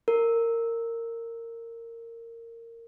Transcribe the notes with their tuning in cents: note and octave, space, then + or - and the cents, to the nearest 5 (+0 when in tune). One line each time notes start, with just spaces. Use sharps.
A#4 -20